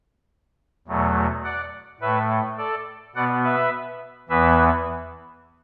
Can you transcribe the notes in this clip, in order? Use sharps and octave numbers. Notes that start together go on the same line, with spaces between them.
E2 B2 F#3 A3
D5 F#5
A2 A3 B4 E5
A4 D5
B2 B3 D5 F#5
B4 E5
E2 E3 B3 B4 E5